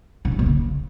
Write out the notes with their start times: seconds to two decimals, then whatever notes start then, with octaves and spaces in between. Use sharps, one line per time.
0.25 C#3
0.32 G2
0.39 B2
0.46 C#3